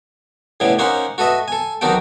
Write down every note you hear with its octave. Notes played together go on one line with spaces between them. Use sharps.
A2 C#3 G3 B3 E4
A#3 C#4 D#4 C5 F#5
F#4 A4 B4 D#5 E5
A4 G#5
B1 D#3 D#4 F#4 A4 G5